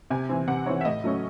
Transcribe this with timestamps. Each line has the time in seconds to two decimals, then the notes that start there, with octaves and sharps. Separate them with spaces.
0.10 C3 G#5
0.29 E3 C4
0.48 C3 F#5
0.66 E3 C4 C#5
0.81 E5
0.85 A2 D#5
1.04 F#3 A3 C#4